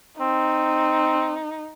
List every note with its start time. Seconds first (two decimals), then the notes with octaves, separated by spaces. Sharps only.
0.20 C4 D#4